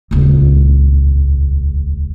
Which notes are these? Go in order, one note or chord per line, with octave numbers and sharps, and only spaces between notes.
D#1 C#2